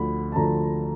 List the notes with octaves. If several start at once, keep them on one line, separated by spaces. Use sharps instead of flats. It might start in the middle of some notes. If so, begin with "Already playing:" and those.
Already playing: D2 D3 F3 B5
A5
D2 D3 F3 A#5